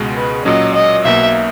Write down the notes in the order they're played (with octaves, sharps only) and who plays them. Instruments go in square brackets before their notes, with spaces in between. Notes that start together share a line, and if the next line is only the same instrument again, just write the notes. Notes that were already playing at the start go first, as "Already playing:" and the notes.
Already playing: [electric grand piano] C#2 B2 G#3 B3
[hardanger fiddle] B4
[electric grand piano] A#2 F#3 C#4 [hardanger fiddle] D#5
[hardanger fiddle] D#5
[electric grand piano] B1 B2 A#3 [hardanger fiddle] E5